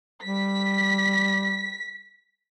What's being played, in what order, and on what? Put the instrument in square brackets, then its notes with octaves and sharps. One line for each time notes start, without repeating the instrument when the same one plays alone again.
[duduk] G3 [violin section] B6